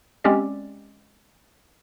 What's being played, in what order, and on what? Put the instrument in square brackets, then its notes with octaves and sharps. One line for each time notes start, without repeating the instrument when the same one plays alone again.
[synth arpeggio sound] G#3 C4 C#4 G4 D5